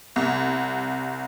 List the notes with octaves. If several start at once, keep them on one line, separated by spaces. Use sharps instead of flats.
C2